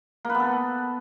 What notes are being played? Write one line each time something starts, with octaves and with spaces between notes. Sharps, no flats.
A#3
B4
B3
A4